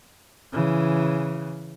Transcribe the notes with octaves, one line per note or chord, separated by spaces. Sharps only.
C#3 E3